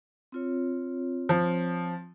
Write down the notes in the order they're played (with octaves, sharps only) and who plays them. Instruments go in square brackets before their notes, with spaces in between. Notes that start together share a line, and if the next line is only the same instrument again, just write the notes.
[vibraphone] C4 F4 C#5
[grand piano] F3